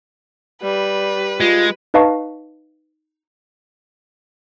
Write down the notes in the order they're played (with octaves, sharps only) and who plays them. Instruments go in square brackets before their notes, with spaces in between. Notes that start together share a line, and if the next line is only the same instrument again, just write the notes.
[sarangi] G3 [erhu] B4
[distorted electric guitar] G#3 [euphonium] F4
[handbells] D#4 B4 D#5 F5 A5 C#6